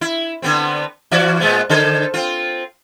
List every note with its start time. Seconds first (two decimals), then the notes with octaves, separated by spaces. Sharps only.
0.01 E4
0.42 D3 B3 C4
1.11 E3 F#4 D5
1.40 A#2 G#3 B3
1.70 D3 A4 C5
2.14 C4 F4